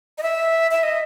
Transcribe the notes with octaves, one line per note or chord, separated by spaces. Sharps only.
D#5
E5
E5
D#5